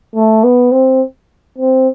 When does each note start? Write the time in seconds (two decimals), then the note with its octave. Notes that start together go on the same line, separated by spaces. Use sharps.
0.15 A3
0.44 B3
0.72 C4
1.58 C4